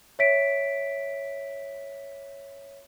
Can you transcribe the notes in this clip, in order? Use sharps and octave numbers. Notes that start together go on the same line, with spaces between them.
C#5 E5 B6 D7